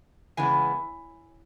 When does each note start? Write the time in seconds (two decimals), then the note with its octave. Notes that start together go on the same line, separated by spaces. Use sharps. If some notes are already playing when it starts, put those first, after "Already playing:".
0.37 C#3 E3 G#3 B3 G#5